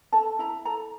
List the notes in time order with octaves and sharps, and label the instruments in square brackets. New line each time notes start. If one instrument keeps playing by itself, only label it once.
[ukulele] A4 A5
E4 A#5
A4 A#5